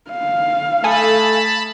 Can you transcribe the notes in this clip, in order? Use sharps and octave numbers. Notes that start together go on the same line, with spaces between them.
F5
A3 A4 G#5 A5 B5 D#6